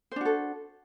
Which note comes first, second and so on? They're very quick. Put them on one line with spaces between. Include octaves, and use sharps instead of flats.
C5 D4 F#4 A4